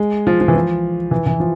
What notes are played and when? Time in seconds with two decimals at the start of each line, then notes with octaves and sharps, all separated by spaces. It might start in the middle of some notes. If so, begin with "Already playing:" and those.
Already playing: G#3
0.27 F3
0.41 F3
0.48 E3
0.56 F3
1.11 E3
1.26 E3
1.40 F3